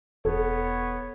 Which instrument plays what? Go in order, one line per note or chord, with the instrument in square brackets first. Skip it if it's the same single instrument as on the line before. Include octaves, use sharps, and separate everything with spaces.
[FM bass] E1 [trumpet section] B3 C#5 [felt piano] A4